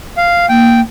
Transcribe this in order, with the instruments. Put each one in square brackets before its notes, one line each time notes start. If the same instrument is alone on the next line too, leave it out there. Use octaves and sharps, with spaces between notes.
[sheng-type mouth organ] F5
[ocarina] A#3 [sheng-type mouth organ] G5